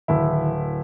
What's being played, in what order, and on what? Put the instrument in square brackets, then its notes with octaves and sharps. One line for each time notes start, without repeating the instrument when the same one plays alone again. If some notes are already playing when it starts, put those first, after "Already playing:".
[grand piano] D1 E4 [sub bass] D#3